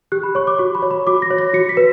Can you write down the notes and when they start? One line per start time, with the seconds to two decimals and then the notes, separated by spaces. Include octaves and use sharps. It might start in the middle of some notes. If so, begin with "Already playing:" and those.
0.12 G4 F#6
0.23 B5
0.35 C#5 C#6
0.47 D6
0.58 F#4 C#6
0.75 B5
0.82 C#5
0.91 B5
1.07 F#4 D6
1.22 A#6
1.30 C#5
1.38 A#6
1.54 F#4 C#7
1.69 B6
1.77 B4